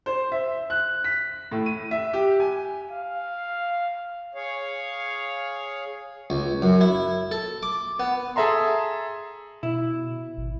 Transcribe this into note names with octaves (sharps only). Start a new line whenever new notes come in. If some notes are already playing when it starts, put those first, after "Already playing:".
C5
E5
F#6
B6
A2
D#7
E5
G4
G#5
F5
G#4 C#5 F5
C#2
F#2
E4
A4
D6
B3
G#4 A4 E5 A#5 C6
B2 E4
G#1